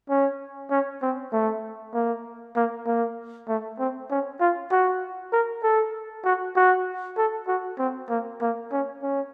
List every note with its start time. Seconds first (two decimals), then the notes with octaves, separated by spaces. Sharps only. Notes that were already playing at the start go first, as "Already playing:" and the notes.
0.09 C#4
0.71 C#4
1.02 C4
1.32 A3
1.94 A#3
2.56 A#3
2.86 A#3
3.48 A3
3.79 C4
4.10 C#4
4.40 F4
4.71 F#4
5.32 A#4
5.63 A4
6.25 F#4
6.56 F#4
7.18 A4
7.48 F#4
7.79 C4
8.09 A#3
8.41 A#3
8.72 C#4
9.03 C#4